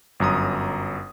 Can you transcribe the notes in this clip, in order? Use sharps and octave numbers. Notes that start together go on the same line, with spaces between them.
G1 F#2 A#5 D#6